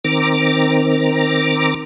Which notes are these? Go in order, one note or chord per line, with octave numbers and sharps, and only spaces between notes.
D#3 C4 A#5 D6